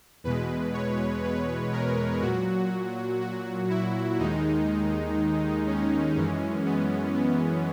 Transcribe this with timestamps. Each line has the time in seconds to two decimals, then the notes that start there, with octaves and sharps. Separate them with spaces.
0.24 E2 B2 G#3 B4
0.74 C#5
1.24 B4
1.73 A#4
2.22 A#2 F#3 F#4
3.21 F#4
3.70 E4
4.19 D#2 D#3 G#3 D#4
5.67 C#4
6.16 F#2 E3 G#3 C#4
6.66 B3
7.15 B3